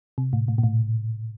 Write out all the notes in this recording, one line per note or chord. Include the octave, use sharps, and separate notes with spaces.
C3
A2
A2
A#2
A2